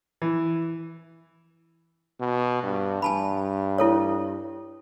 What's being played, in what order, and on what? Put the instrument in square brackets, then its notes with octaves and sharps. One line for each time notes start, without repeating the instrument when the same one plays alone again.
[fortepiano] E3
[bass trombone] B2
G2
[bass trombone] G2 [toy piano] G#5 A5 B5
[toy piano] E4 A4 C#5